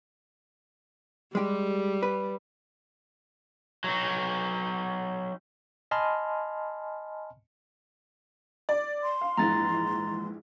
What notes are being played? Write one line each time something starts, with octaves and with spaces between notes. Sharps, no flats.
G3 G#3 G4
B4
F#3 D#4
D#5 G#5 A5 B5 C6 F6
D5
C6
F5
A#1 G#2 E3 A#5 A6